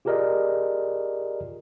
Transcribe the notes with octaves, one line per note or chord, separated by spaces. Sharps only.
F4 G4 G#4 A#4 D5 D#5